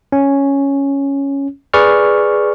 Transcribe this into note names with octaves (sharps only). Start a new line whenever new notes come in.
C#4
G#4 B4 D5 C#6 F6